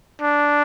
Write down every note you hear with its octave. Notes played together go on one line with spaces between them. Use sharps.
D4